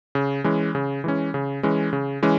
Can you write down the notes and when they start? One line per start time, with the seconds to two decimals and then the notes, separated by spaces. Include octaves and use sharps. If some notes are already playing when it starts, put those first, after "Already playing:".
0.15 C#3
0.44 E3 G#3 C#4
0.75 C#3
1.04 E3 G#3 C#4
1.34 C#3
1.63 E3 G#3 C#4
1.93 C#3
2.23 E3 G#3 C#4